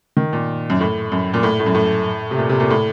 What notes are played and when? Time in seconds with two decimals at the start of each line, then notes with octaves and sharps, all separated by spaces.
0.17 D#3
0.33 A#2
0.70 F#2
0.80 A2
1.12 F#2
1.33 A#2
1.43 A2
1.60 A2
1.66 F#2
1.75 A2
2.31 C3
2.38 A#2
2.49 C3
2.60 A#2
2.70 A2